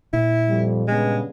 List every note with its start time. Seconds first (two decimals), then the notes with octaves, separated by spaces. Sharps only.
0.13 A#2 E4
0.48 F2 G3
0.88 G2 C#3 G#3 B3